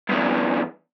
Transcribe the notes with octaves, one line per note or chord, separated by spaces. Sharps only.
E2 G2